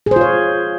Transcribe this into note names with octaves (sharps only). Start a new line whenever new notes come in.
F4 G#4 C5 C#5